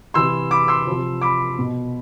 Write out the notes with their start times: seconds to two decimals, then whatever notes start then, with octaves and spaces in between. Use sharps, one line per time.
0.14 C3 E3 C6 E6
0.51 B5 D6
0.68 C6 E6
0.87 C3 F3
1.21 B5 D6
1.58 B2